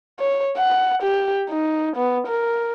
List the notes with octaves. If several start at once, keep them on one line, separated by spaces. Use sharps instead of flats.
C#5
F#5
G4
D#4
B3
A#4